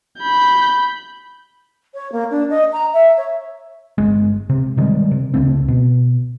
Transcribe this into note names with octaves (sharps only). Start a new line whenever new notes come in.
B5 G6
C#5
A#3
D4
D#5
A#5
E5
C#5
G1 G#3
C3
C3 D#3 G3 G#3
C3
C#2 C#3 A3 C4
B2